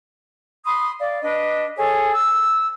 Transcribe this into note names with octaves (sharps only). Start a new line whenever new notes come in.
B5 C6 D#6
D5 F5
D4 B4 D#5
G#4 A4 C#5
E6